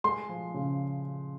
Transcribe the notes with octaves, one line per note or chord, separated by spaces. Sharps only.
G#3 C6
F3
C#3